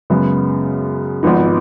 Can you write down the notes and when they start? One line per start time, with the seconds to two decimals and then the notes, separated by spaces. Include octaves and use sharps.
0.10 F#2 C#3 G#3 B3
1.23 G#1 G#2 F3 B3 D#4